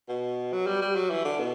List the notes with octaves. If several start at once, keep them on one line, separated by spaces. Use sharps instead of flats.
B2
F#3
G3
G3
F#3
E3
D3
B2